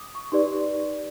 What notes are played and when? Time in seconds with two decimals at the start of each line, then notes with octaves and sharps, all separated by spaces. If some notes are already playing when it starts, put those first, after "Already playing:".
Already playing: D6 D#6
0.15 C#6
0.32 D#4 G4 B4 D5 C6